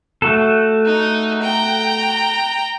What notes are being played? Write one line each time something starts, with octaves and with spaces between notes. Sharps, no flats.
A3 F#4 A4
D#4
G5 A#5